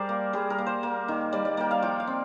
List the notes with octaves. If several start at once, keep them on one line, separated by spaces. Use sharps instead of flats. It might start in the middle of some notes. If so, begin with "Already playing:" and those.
Already playing: G3 G#4 A#4 C5 D5
A#3
G3 G#4
A#4
A#3
C5
A#3
D#3
G3 D5
D5
A#3 G5
F5
F3 G5
F5
C4